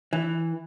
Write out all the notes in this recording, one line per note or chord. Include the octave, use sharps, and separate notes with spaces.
E3